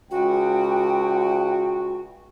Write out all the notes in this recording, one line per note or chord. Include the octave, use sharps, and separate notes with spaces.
C#2 F#4 G5